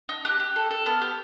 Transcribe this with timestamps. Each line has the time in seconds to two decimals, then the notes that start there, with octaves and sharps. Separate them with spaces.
0.09 D#4
0.25 G4 F#6
0.40 G4
0.56 A4
0.71 A4
0.86 B3 F6
1.02 G4